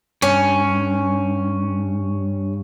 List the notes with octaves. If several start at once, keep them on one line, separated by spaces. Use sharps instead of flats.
G2 C#4